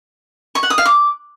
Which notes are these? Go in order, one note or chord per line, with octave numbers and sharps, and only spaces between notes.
C#6
F#5
D#6
F5
D6